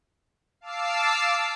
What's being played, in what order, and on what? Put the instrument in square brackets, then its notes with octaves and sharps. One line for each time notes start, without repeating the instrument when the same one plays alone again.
[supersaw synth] F5 A5 D6 E6 C7